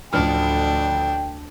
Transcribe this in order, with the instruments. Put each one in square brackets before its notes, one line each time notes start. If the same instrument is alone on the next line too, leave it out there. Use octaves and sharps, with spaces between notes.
[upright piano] A1 F3 F6 [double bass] D2 D3 [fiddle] D4 [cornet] G5